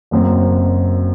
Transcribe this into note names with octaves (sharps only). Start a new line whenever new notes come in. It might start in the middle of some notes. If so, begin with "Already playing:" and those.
F#1 F#2 F#3 C4